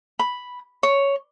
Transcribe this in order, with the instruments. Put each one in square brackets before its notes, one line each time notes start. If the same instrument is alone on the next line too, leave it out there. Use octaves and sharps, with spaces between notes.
[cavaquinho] B5
C#5